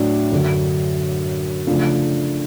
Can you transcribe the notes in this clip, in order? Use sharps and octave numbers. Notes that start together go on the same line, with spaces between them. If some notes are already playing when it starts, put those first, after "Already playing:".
Already playing: A2 F#3 D4
F#2 D3 F#3
C#3 F3 A3 D4